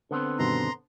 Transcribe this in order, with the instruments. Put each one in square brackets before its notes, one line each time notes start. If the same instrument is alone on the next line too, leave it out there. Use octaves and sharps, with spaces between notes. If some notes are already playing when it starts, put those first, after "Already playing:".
[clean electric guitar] D3 B3 C4
[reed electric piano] G2 B2 D#3 [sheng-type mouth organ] A#5 C6